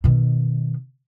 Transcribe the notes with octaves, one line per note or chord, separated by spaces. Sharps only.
B2 D#3